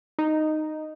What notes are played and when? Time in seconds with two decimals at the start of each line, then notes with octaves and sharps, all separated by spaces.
0.19 D#4